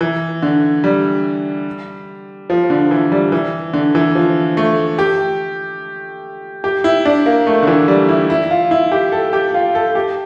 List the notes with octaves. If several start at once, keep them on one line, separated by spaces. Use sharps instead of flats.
E3
D3
G3
F3
D3
E3
G3
E3
D3
E3
F3
A3
G4
G4
E4
D4
A#3
A3
D3
E3
G3
E4
E4
F4
E4
G4
A4
G4
F4
A4
G4